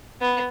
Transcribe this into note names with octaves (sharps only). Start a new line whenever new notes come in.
B3